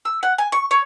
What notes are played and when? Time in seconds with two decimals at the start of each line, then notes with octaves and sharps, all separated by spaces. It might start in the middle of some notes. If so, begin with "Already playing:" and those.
0.05 E6
0.23 F#5
0.38 G#5
0.52 C#6
0.71 C#5